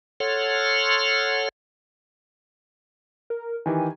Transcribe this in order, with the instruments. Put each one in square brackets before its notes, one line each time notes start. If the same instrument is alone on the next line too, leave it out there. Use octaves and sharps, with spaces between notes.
[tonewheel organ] A4 C#5 F#5 C6 F6
[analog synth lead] A#4
[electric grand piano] D#3 E3 G4 [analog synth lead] G#5